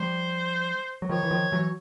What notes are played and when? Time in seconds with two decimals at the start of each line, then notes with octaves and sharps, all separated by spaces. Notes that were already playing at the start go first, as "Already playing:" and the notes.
Already playing: F3 G3 C5
1.02 F#3
1.09 D#3 F3 C#5
1.23 E3
1.31 D#3 F3
1.52 E3 F#3